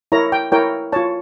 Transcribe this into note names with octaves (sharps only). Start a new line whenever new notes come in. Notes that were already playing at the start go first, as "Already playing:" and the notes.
E4 A#4 C#5 A#5
G5
E4 A#4 C#5 G5
F4 C#5 A5